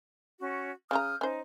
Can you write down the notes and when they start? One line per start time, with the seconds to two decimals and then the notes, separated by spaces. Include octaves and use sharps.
0.40 C#4 F#4
0.91 C#3 F4 A#5 D#6 F6 G6
1.21 C#4 D#4 C5